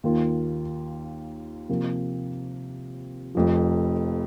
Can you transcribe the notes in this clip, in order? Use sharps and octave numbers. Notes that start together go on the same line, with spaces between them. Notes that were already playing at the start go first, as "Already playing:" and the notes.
D#2 D#3 A#3 F4
C3 F3 A#3
F1 F2 F3